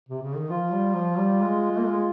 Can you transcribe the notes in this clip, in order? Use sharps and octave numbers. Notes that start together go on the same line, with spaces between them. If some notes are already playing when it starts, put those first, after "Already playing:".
C3
C#3
D#3
F3 F4
G3
F3
G3
G#3
G#3
A#3
G#3